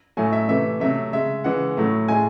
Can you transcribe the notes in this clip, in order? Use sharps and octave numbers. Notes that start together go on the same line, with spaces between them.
A2 F#3 A3 G#5
E5
C3 E3 A3 E5
C3 F#3 A3 E5
C#3 G#3 E5
C#3 E3 G#3 F#5
A2 F#3 A3
A2 G#3 G#5